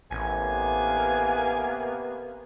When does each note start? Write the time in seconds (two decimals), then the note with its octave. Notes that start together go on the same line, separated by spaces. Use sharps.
0.11 A1 C3 A#3 B3 G#5